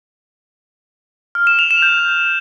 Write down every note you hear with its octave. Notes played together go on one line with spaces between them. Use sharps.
F6
E7
F7
E7
G6